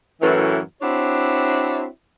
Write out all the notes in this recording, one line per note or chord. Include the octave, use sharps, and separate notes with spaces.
F#2 A2 E3
C4 D4 E4 F#4 C#5